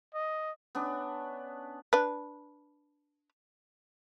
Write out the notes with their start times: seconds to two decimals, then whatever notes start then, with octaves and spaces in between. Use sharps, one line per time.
0.14 D#5
0.75 B3 C#4 D4
1.93 D4 B4